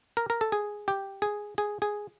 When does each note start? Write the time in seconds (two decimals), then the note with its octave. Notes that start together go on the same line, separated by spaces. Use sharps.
0.17 A#4
0.30 A#4
0.41 A4
0.52 G#4
0.88 G4
1.22 G#4
1.58 G#4
1.82 G#4